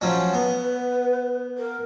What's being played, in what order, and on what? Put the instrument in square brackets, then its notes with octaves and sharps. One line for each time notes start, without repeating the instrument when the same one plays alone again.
[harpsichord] F3 F#3 C#4 [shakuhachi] C5
[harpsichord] B3 [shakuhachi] B4
[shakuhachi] A#4